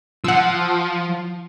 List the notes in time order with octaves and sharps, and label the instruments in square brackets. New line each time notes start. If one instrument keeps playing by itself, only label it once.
[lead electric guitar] F3 [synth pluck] F#5 E6